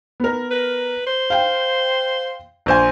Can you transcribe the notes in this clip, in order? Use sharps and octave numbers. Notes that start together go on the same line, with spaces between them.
B3 A#4
B4
C5
F5 G5
A#1 C5 G#5